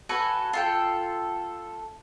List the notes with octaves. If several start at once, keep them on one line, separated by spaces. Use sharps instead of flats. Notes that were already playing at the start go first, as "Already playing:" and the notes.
F#4 A4 B4 G#5
F4 A4 G5